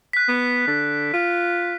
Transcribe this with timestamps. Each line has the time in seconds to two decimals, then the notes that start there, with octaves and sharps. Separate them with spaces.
0.13 F#6 B6
0.28 B3
0.67 D3
1.13 F4